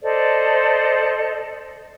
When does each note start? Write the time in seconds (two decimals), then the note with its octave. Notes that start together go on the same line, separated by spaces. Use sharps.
0.03 A4 C5 D5 D#5